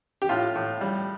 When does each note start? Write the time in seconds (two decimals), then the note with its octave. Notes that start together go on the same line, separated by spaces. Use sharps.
0.22 G4
0.29 A2 F4
0.55 A2
0.81 G3